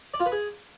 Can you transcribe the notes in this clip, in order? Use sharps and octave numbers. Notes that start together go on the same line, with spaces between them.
D5
F4
B4
G#4